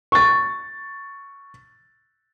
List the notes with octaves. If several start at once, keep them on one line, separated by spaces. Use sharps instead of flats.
C#6 A6